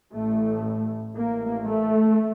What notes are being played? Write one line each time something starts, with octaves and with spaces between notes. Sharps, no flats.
A1 A2 A3
A1 A2 A#3
A3